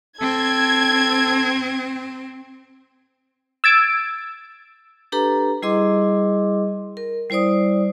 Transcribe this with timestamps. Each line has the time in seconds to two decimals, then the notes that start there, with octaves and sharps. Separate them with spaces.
0.21 C4 A4 G#6
3.64 E6 G#6 A6 D7
5.12 D4 G4 A4 B4 A#5
5.62 G3 E4 G#4 D#5 C6 D6
6.97 A#4
7.30 G3 E4 C5 D5 D#6